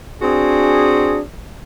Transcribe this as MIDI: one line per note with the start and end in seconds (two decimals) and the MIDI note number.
0.21 1.20 60
0.21 1.20 62
0.21 1.20 66
0.21 1.20 68